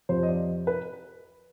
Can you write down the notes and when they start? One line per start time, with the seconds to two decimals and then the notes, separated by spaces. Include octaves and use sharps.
0.09 F2 C3 F3 C5
0.23 D#5
0.28 D5
0.67 B4